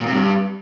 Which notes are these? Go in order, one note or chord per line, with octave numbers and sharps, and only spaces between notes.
A#2
C3
G2